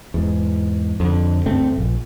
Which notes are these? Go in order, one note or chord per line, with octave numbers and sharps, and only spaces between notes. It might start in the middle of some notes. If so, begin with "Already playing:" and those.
E2 G#2
F2 D3
D2 G2 A3 C4
A#1